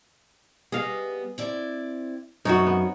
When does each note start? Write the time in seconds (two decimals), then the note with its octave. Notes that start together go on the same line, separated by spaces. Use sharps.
0.72 G3 B3 G#4 D#5 F5
1.38 C4 E4 D5
2.45 F#2 F#3 C4 D#4 F#4 C#5
2.67 B3